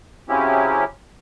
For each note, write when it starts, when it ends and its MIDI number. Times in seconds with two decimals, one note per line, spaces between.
0.29 0.84 49
0.29 0.84 54
0.29 0.84 60
0.29 0.84 61
0.29 0.84 64
0.29 0.84 67